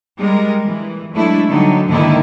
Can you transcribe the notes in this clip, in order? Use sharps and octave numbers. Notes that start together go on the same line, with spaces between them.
G3 G#3 A#4
E3
F#3 G#3 A3 D4 E4
D3 F#3 G3 D#4
D#2 G#2 D3 D#3 D#4 E4